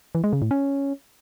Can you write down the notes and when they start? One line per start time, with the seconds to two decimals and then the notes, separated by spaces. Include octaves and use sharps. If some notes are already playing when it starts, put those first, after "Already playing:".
0.15 E3
0.24 G#3
0.33 C#3
0.42 A2
0.51 C#4